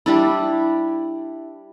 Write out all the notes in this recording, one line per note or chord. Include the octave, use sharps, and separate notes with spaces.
G3 D4 E4